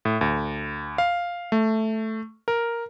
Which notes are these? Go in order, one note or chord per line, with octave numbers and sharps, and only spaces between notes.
A2
D2
F5
A3
A#4